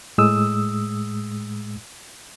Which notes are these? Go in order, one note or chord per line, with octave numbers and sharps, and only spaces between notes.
A2 G#3 D#6 E6